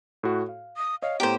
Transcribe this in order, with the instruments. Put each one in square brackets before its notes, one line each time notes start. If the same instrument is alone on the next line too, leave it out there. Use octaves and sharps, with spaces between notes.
[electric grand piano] A2 F#4
F5
[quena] D#6
[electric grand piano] C#5 D#5 [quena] F5
[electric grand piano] A2 B3 C#5 [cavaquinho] G4 C5 [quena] A#5